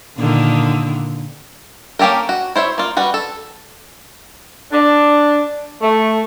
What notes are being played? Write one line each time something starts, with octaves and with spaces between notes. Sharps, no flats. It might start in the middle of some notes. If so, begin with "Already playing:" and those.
A#2 D3 D#3
A#3 C#4 G4 A4 A#4
F#4
E4 C5 C#5 E5
A#3 F4
G3 F#4 B4
A4
D4
A3